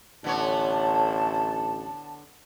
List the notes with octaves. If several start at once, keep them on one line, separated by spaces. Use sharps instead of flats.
A1 D3 B3 C#5 A5